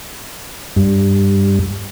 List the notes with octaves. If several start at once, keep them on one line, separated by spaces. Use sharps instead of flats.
G2